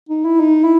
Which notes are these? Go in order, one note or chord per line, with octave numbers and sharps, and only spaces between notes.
D#4
E4
D#4
E4